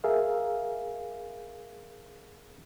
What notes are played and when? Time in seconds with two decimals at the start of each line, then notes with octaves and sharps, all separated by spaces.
0.04 G#4 A#4 E5 F5